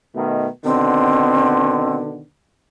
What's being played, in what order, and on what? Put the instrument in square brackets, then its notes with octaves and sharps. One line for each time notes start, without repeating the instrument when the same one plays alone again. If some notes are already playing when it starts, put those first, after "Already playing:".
[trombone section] B2 D#3 A3
[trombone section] B2 D3 D#3 [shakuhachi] C4